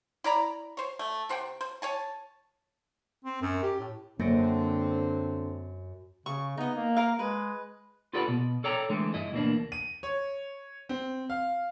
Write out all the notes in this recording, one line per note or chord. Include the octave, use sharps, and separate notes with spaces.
E4 D5 A#5 B5
C5 C#5
A3
C3 C5 F#5 G5
C5
C#5 G#5 A5
C4
F#2
G4
A2
F#2 D3 A#3 C4 A#6 D7
C#3 C#6
B3 D#4 D#5
A#3
A#4 F5
G#3 B4
F4 G4 A4 B4 D5 F#5
B2 B3
A4 C#5 D5 G5 A#5
D3 E3 G#3 A3 C4
G2 E4 D#5
D2 B2 E3 A3 A#3 D4
D#7
C#5
C4
F5